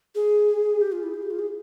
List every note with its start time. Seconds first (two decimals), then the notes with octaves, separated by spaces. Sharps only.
0.15 G#4
0.81 G4
0.92 F4
1.03 E4
1.14 G#4
1.22 G4
1.31 F4
1.39 G#4